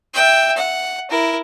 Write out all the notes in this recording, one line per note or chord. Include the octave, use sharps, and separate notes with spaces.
E5 G5
F#5
E4 A#4